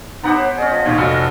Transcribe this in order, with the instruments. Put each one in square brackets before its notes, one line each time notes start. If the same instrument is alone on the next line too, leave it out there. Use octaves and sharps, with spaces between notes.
[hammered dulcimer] B3 G4 C5 [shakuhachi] D#4 [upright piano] F#5 A#5
[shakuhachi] C#5
[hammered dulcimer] C#4 G#4 [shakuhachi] D#5
[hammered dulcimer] F3
[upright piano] D#2 A#2 D#3
[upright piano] F1 F#4 [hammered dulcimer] A4 [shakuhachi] D#5